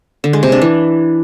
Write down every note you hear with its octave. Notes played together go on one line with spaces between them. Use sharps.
D3
G#3
C3
D4
E3